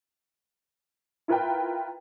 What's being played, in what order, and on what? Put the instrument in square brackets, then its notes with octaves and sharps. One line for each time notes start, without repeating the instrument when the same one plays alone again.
[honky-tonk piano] E4 F4 A#4 B4 G5